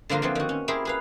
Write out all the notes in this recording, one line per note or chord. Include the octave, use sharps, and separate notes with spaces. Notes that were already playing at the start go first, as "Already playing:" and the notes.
D3 F3 A#3 F4 A#4
D3 E3 F3 C4
D#3 F#4
C#4
E4 G4 G#4 A#4 C5
G#4 B4 F5